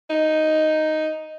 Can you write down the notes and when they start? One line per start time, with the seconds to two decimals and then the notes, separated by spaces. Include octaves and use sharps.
0.10 D#4